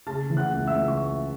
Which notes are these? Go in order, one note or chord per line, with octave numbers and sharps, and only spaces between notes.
C#3 A5 A6
E3
F#5 F#6
C#2
E5 E6
C#2
C#6